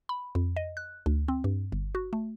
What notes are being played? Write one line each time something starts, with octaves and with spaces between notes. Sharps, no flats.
B5
F2
D#5
F#6
D2
C4
G2
G1
F#4
A3